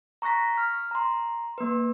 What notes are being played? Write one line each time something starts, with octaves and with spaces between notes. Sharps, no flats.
A#5 C#6 F#6 A#6 B6
F6
A#5 C6
A#3 B4